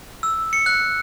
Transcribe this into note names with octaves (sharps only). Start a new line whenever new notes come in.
E6
C#7
F#6